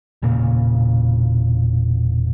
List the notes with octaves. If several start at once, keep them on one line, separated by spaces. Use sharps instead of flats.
E1 A#2 C#3 A#3